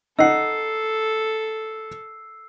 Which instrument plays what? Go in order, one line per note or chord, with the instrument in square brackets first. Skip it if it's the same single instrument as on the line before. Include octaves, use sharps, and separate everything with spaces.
[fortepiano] D#4 F#5 [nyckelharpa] A4 [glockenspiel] E6 C7